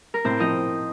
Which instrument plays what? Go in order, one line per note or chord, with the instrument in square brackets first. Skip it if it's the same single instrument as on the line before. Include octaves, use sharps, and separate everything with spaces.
[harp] A#4
[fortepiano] A2 [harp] C4 C5
[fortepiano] F3 [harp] D#4 D#5